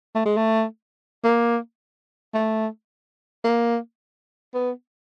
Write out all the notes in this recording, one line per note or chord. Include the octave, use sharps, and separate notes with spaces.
A3
G#3
A3
A#3
A3
A#3
B3